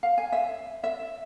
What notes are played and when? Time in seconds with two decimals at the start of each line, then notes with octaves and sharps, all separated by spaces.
0.03 F5
0.18 G#5
0.32 E5
0.84 E5